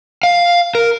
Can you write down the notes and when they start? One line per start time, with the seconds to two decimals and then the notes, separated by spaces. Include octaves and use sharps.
0.23 F5
0.75 A#4